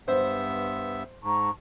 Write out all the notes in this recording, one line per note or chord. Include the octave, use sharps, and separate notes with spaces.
G2 B3 C5 E5
G#2 A5 A#5 C#6